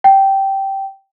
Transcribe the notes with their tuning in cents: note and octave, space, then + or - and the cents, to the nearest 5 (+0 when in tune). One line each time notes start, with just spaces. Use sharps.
G5 -10